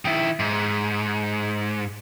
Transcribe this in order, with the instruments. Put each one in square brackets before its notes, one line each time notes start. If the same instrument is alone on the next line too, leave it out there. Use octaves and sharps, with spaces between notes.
[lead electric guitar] D#3 E4
G#2